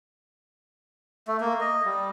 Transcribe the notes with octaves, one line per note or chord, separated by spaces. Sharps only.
A3
A#3
D#5
G3